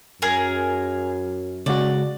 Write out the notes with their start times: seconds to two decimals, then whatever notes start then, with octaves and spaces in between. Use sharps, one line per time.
0.22 F#2 G#4 A#4
1.66 C#3 G#3 F#4 D5